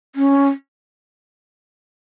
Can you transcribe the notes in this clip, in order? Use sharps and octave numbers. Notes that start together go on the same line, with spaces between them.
C#4